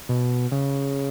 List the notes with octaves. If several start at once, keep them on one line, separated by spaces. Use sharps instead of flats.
B2
C#3